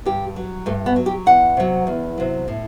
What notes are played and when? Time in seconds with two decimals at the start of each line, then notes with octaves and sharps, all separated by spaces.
0.05 G2 G4
0.36 F#3
0.66 G2 A3
0.86 B3
0.96 F#3
1.06 G4
1.26 E2 F#5
1.57 C3 F#3
1.87 E2
2.18 C3 F#3
2.48 A2